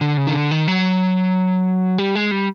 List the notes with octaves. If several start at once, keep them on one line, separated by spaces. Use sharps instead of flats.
D3
C#3
D#3
D3
D#3
F#3
G3
G#3
G3